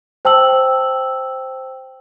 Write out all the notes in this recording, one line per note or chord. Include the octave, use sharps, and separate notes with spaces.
C5 G5 A5 E6 F#7